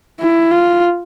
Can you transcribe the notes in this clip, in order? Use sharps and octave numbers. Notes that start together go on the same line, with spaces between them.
E4
F4